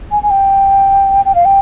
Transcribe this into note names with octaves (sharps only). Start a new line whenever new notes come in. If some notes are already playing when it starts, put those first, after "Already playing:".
G#5
G#5
G5
G5
F5
G5